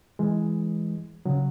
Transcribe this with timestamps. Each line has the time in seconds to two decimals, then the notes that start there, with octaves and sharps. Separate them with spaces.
0.19 E3 G#3
1.26 C#3 F#3